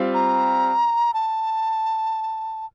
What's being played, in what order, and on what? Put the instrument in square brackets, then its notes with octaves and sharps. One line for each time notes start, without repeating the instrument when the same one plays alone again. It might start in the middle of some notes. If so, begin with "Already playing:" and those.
Already playing: [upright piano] G3 C4 F4
[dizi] A#5
A5